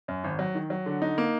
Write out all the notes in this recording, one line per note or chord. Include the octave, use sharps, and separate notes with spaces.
F#2
G#1
F#3
D#3
F#3
D3
D#4
A#3